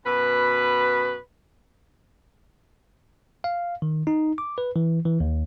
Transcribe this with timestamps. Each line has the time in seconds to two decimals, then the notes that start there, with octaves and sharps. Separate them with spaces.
0.06 F#2 B2 B4
3.44 F5
3.82 D#3
4.07 D#4
4.38 D6
4.58 B4
4.76 E3
5.06 E3
5.20 D#2